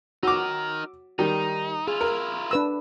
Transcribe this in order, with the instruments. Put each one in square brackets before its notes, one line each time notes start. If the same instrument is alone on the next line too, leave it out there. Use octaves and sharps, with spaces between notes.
[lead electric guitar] D#4 A#4 [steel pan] F#4 [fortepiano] D6 E6
[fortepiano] D#3 G3 [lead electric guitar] D#4
[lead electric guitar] E4 F4 [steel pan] G#4
[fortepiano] A#4
[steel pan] D4 B4 E6